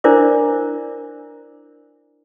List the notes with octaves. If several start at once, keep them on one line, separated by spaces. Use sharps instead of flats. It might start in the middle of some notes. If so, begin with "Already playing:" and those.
D4 E4 A#4 C5 D5 D6